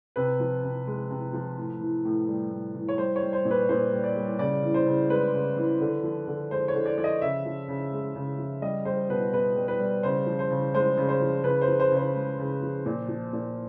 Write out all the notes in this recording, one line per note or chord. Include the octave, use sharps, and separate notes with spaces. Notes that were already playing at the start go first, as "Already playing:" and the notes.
C3 B4
F3
C3
G#3
C3
F3
A2
E3
A2
G3
A2
E3
C#5
G3 C5
C#5
G3
C5
A#2
B4
A#2 C5
G3
D5
G3
C#3 D5
E3
C5
C#3
G#3 B4
C#3
E3
D3
F3
D3
G#3 C5
C#5
D3
D5
F3 D5
D#5
C#3 E5
F3
C#3
G#3
C#3
F3
G3 D#5
G3 C5
B2 B4
B2 B4
G3
B4
G3
C#3 C5
F3
C5
C#3
G#3 C5
C#3
C5
F3
C#3 B4
C5
F3
C5
C#3
C5
G#3
C#3
F3
A#2
F3
A#2